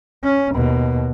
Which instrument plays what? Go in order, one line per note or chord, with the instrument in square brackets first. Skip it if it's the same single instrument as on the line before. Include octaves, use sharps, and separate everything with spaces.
[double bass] C#4
D#2 B2